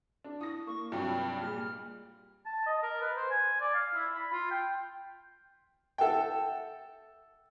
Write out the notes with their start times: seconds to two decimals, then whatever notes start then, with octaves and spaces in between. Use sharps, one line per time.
0.24 D4
0.41 E4 D#6 A#6
0.67 A#3 C#6
0.92 G2 C3 F#3 F4 G5
1.40 A#2 G3 G#3 F6
2.46 A5
2.67 D#5
2.83 A#4
3.01 B4
3.16 C5
3.30 G#5
3.61 D5
3.74 F5
3.94 E4
4.14 B5
4.32 F4
4.51 G5
5.98 A4 E5 F#5 G5